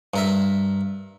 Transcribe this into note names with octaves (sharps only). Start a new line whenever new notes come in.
G2 A#4 E5